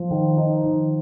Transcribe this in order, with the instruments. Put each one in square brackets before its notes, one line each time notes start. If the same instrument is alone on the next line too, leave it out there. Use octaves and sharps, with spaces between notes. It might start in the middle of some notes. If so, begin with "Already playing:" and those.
Already playing: [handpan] F3
[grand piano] D#3
D#4
D#3